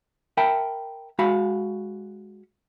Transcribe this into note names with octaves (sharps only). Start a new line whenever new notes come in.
A#4 E5 G5 A5 B5
G#3 F#4 F5 B5